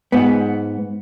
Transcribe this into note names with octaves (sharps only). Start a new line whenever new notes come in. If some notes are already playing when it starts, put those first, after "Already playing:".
G#2 B3